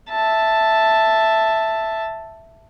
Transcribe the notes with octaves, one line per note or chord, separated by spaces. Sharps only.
E5 A5